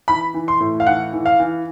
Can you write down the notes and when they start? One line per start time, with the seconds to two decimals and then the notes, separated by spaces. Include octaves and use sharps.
0.08 E3 B5
0.34 E3
0.48 C6
0.60 A2
0.80 F5
0.87 E3 F#5
1.13 E3
1.26 F5
1.40 E3